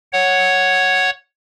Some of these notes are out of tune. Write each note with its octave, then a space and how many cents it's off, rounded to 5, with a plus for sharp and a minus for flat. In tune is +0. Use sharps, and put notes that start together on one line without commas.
C#5 +0 F#5 +0